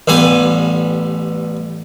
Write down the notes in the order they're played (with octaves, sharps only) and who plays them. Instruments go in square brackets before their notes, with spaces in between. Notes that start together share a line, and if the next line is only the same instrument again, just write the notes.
[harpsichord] A1 G3 B3 G#5